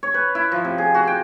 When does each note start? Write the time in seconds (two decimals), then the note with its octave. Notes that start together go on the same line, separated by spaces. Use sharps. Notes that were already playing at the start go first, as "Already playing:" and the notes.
0.03 C#5
0.14 B4
0.35 E4
0.52 F3
0.65 C3
0.78 G#4
0.94 F#4
1.07 G5